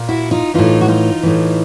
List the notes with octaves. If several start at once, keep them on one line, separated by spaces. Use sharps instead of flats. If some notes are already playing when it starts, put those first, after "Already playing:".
Already playing: A#2
E4 F#4
D#4 F4
A2 E3 D#4 F4
F#4
D#4 F4
A2 E3